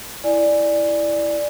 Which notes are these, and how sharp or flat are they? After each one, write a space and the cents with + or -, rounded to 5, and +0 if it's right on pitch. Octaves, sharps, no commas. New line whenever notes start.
E4 +0 D5 +5 G#5 +0